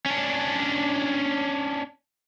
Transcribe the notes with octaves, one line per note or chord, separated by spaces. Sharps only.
C#4 D4